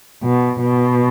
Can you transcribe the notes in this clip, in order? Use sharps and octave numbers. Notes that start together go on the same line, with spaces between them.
B2
B2